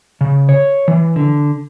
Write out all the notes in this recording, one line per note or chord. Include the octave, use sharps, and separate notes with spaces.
C#3
C#5
E3
D3